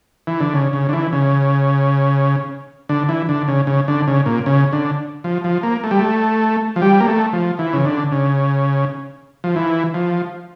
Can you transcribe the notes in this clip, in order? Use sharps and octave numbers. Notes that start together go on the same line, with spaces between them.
E3
D3
C#3
C#3
D3
E3
C#3
D3
E3
D3
C#3
C#3
D3
C#3
A#2
C#3
D3
F3
F3
A#3
A3
G3
A3
F3
G3
A#3
A3
F3
E3
C#3
D3
C#3
F3
E3
F3